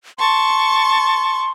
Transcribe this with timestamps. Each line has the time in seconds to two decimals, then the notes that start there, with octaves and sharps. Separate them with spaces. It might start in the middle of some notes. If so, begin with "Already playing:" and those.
0.19 A5 C6 C#6